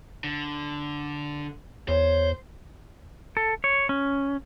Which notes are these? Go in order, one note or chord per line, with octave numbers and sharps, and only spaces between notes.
D3
E2 C5 C#5
A4
C#5
C#4